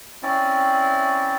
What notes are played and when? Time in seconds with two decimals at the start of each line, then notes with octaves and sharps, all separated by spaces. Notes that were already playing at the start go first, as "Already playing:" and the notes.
0.23 C4 C#4 E4 D5